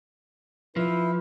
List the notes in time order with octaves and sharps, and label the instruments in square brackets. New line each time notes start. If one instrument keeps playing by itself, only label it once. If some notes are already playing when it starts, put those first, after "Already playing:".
[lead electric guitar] F3 [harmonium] E4 B4